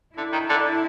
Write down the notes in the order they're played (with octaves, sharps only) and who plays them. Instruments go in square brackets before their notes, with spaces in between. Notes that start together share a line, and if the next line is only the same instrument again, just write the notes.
[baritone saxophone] D3 [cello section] D4 E4
[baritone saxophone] D#3
D3